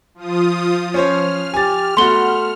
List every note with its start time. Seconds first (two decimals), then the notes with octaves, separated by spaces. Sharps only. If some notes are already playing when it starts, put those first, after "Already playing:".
0.15 F3 F4 D#6
0.94 F3 C#4 C5 C#5 F6
1.54 G4 G#5 A6
1.97 A3 B3 F#4 C6 G7